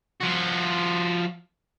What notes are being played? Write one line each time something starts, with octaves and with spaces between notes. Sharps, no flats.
F3 F#4